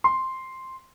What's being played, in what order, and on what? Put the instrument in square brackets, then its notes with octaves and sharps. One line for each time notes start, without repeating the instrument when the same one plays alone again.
[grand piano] C6